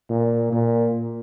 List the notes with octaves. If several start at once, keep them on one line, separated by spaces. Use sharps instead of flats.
A#2
A#2